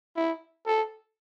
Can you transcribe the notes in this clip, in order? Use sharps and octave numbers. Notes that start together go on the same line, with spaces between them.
E4
A4